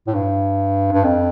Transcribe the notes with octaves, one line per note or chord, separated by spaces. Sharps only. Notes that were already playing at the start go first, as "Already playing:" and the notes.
A2
G2
G2
F2